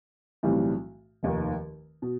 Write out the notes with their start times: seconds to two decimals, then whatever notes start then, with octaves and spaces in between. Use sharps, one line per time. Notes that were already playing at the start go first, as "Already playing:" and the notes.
0.43 B1 A2 E3 G3 C4
1.23 F1 D#2 D#3
2.02 B2